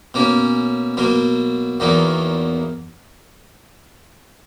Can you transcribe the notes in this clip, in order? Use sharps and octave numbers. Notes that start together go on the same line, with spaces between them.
B2 A#3 C#4
B2 F#3 A#3
E2 D#3 F#3 A#3